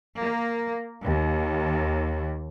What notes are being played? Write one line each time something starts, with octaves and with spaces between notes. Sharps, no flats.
A#3
D#2